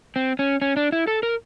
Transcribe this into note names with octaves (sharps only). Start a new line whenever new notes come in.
C4
C#4
C#4
D4
E4
A4
A#4